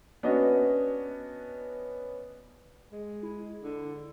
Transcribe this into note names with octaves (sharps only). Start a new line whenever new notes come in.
B3 C#4 D4 F#4 D#5
G#3
E4
D3